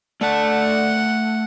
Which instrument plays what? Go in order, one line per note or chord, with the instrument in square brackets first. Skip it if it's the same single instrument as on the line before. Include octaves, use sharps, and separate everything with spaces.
[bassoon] D3 [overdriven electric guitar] A3 A5 [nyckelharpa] F#5